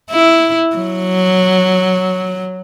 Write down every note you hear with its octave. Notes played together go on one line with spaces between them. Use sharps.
E4
F#3